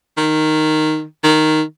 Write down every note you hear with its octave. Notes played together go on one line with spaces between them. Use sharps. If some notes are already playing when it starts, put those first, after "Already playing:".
D#3
D#3